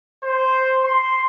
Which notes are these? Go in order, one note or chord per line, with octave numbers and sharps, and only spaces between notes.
C5
C6